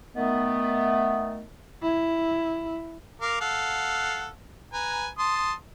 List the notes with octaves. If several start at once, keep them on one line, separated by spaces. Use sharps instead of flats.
D#3 A3 B3
E4
A#4 F5 D6
A4 F5 F#5
B4 G#5 A#5
A5 C6 D#6